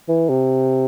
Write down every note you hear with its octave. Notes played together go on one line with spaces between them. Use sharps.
E3
C3